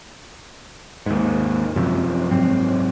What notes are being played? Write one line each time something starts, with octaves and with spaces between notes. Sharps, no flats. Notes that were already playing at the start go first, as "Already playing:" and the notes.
D#2 G#2
F#2 C3 F3
G#2 F#3 C4